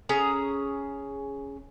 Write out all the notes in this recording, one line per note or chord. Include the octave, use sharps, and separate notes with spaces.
C#4 G#4 A#5